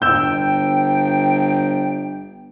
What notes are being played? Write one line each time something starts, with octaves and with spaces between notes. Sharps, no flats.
G1 G5 E6 G6